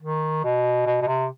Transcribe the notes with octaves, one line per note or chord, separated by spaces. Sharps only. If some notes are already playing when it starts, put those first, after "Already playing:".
D#3
B2
B2
B2
C3